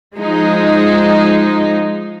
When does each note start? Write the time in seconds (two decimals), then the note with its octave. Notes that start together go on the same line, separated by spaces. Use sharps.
0.15 F3 G#3 D#4